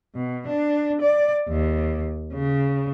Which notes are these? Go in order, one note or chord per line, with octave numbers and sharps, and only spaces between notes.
B2
D4
D5
D#2
C#3